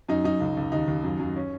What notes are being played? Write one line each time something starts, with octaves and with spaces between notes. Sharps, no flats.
F#2 D#4
F#2 D#4
C#2
C#2
D#2 D#4
D#2
F#2
F#2
C#4